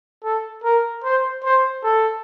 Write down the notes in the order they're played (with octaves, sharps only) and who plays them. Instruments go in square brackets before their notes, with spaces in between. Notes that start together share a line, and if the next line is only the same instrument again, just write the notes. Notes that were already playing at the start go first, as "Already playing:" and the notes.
[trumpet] A4
A#4
C5
C5
A4